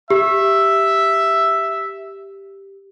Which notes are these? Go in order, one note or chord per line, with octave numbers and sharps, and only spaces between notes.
G4 E5